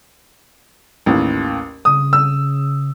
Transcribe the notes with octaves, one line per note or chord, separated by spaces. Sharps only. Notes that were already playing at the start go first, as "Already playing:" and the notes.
A1 D#2
C#3 D#6
E6